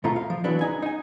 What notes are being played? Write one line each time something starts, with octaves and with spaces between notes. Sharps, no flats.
D#2 B2 A3 F4 A#5
F5
F3
E3 F#3 B3 D4
C#2 D#4 G#5
D#4 G#5